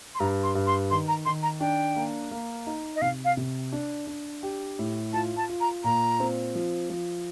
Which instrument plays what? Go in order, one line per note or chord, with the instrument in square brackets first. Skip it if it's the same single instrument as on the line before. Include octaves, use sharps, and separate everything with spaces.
[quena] C6
[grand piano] G2 [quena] A#5
[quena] C6
[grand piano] G2
[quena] C6
[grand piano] D#3 [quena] C6
[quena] A#5
[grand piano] D#3 [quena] C6
[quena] A#5
[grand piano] D4 [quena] G5
[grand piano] A#3
A#3
D#4
[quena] D#5
[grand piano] C3 [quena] F5
[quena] F5
[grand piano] C3
D4
D4
G4
A2
[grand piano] F4 [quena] A5
[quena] A5
[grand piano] F4
[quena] A#5
[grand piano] A#2 [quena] A#5
[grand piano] C4
F3
F3